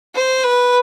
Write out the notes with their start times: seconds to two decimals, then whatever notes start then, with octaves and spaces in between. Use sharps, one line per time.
0.15 C5
0.43 B4